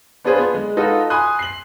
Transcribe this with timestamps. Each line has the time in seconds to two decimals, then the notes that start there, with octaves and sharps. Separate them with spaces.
0.25 B3 D4 F4 G#4 B4 C5
0.38 B3
0.55 G#3
0.77 D#4 F4 F#4 A4 B4
1.10 G#5 B5 C6 D#6 F#6
1.39 C7 F#7